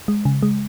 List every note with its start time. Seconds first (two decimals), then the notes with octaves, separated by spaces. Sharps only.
0.08 G#3
0.25 C#3
0.43 G#3